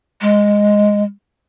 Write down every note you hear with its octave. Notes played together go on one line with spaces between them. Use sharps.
G#3